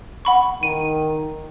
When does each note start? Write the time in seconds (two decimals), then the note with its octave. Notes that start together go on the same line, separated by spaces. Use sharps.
0.25 F#5 B5 C#6
0.63 D#3 D#7